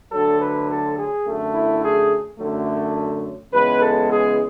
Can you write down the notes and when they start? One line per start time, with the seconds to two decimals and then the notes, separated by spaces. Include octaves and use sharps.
0.12 D2 D3 F#3 A4
0.40 B4
0.69 A4
0.97 G#4
1.25 F#2 D3 A3
1.53 E4
1.82 G#4
2.39 F#2 D3 F#3 A3
3.52 C#2 C#3 E3 G#3 B3 B4
3.81 A4
4.09 G#4